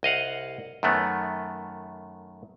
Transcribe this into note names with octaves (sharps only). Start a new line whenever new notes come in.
C2 D#5 F5 F#5
F#2 D#3 A3 B3